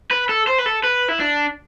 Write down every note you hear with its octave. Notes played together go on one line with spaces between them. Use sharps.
B4
A4
C5
B4
A4
B4
E4
D4